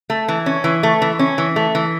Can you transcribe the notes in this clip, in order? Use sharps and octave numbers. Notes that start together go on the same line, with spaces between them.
A3
E3
C#4
E3
A3
E3
C#4
E3
A3
E3